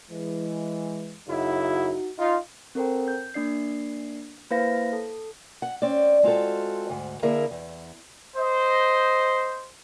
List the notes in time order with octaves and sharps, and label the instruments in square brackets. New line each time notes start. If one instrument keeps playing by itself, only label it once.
[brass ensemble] E3 G#3
[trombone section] F#2 C#3 E4 [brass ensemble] D#4 F#4
[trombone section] D#4 F4
[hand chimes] C4 A4 A#4 C5 G5
G6
A#3 D4 D5 C7
A#3 E4 B4 C5 F5 A#6
A4
[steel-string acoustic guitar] F#5
C4 C#4 D5
G#3 C4 F4 F#4 A4
D2 G#2 F#5
D3 A#3 E4 G#4 A#4 E5
E2
[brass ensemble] C5 D#5